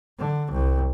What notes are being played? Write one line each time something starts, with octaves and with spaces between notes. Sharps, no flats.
D3
C2